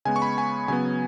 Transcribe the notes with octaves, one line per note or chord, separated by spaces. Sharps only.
C#3 G#3 B3 G#5
C#6
B5
G#5
C#3 F#3 B3 G#5